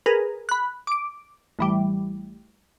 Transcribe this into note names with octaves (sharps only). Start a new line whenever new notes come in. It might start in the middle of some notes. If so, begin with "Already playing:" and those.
G#4 A#4 B4
B5 F#6
D6 D7
A1 E3 G3